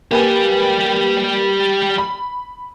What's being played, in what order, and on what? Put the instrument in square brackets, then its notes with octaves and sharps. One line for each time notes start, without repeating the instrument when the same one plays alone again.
[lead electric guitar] G3 G4 [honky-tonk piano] A#3 B4 G#5
[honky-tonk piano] B5